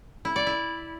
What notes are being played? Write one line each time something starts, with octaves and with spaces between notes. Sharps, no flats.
E4
D5
E4